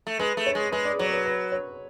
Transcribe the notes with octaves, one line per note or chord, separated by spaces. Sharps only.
A3
G#3 B4
A3
C#5
G#3
G#3 B4
D5
F#3 C#5
B4
B4
C#5